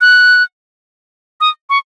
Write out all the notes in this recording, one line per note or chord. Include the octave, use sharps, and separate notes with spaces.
F#6
D#6
C#6